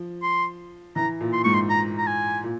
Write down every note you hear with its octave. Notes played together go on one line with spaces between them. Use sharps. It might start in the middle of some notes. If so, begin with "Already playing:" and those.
Already playing: F3
C6
E3 A#5
A#2
C6
G#2 C#6
C6
A#5
A#5
G#5
A#2